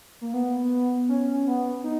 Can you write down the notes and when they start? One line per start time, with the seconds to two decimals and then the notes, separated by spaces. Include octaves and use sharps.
0.21 A#3
0.34 B3
1.09 C#4
1.47 B3
1.84 D#4